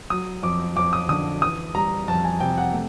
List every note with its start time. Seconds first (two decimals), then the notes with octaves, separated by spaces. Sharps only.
0.10 F#3 D#6
0.43 F2 D6
0.76 F2 D6
0.93 D#6
1.09 D3 D#6
1.41 E3 D#6
1.75 G3 A#5
2.08 F2 A5
2.25 G#5
2.40 C3 G5
2.58 F#5
2.73 A3